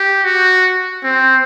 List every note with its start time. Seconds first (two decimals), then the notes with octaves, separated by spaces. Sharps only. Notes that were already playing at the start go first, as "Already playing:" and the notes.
Already playing: G4
0.25 F#4
1.04 C4